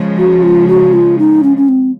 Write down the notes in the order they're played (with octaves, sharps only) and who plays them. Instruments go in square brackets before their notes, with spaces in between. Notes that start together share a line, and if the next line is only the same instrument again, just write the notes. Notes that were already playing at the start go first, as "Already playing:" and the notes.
Already playing: [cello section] C#3 F3 G#3
[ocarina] F#4
F4
F#4
F4
D#4
C#4
C#4
C4